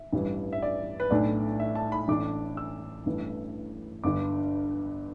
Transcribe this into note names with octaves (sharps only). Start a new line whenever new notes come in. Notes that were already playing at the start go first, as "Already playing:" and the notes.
Already playing: E5
A1 G2 E3 G3
E5
D5
B4
B1 A2 A3 D4 D5
E5
A5
B5
A1 A2 A3 D4 D6
E6
A1 G2 E3 A3
G1 G2 D3 D6